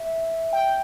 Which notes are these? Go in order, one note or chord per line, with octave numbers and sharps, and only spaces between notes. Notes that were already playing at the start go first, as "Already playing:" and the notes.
Already playing: E5
G5